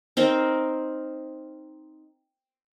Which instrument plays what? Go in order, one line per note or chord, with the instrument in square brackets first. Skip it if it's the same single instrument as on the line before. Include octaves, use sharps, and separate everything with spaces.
[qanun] C4 D#4 A#4 C5